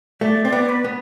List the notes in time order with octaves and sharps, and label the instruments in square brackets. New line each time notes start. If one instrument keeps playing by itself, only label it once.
[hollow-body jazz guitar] A3 [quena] D5
[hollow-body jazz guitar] C4 [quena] D5
[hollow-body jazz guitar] B3
[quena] B4
[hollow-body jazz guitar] B3